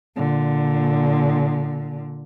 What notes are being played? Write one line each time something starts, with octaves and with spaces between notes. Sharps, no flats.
A#2 D3